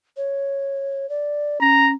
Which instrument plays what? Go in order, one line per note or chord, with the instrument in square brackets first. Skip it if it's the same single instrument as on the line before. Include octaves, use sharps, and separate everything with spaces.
[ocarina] C#5
D5
[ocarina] C#4 [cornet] A#5